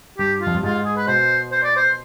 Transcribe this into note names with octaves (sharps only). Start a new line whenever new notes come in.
G2 G4
F4
F2
G2
G#2 F4
G#4
B4
B2 C5
C5
D5
C5